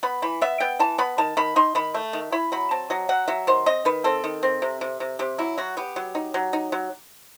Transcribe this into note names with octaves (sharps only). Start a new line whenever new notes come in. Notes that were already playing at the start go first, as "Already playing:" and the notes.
B3 B5
E3 B5
B3 E5
B3 G5
E3 A5
B3 B5
D#3 A5
D#3 B5
D#4 C6
D#3 B5
A3
D#3
E4 B5
F#3 B5
C4 A5
F#3 D#5
F#3 F#5
F#3 E5
D#3 C5
C4 D#5
D#3 B4
C4 A4
D#3
C4
C3
C3
C3
C3 G4
F#3 E4
F#3 F#4
B3 G4
F#3
D#4
F#3
D#4
F#3